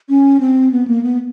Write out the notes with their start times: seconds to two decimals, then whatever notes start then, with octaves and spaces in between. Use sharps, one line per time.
0.09 C#4
0.40 C4
0.72 B3
0.88 A#3
1.03 B3